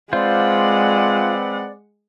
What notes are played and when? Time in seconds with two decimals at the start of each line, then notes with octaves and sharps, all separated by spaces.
0.13 G#3 C4 F4 B4 C5 D5 F#5